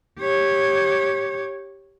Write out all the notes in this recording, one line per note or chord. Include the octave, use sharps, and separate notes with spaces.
G4 C#5